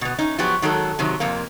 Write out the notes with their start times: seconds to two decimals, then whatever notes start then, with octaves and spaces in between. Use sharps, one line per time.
0.01 B2 B3
0.18 C#4 D#4
0.38 F3 F#3 B3 F#4 G4
0.62 D#3 F#3 G#3 A4
0.99 C3 D#3 F#3
1.20 F2 C3 A#3